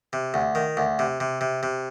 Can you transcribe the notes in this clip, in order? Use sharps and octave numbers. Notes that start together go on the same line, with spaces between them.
C3
D2
D#3
D2
C3
C3
C3
C3